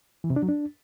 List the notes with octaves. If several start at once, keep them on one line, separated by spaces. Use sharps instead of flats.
E3
C3
D4
F#3
D4